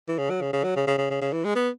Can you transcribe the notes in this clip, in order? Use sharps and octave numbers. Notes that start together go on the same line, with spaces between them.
E3
C#3
F#3
C#3
C#3
F#3
C#3
C#3
C#3
C#3
C#3
E3
G#3
B3